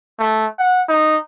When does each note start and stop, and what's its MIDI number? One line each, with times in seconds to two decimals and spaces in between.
0.19 0.46 57
0.59 0.81 78
0.89 1.18 63